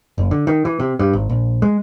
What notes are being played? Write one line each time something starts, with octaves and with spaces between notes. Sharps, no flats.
F#1
D3
D#3
E3
C3
G2
G#1
A#1
G#3